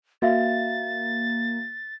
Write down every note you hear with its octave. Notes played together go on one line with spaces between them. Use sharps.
A#3 F#4 E5 F5 A6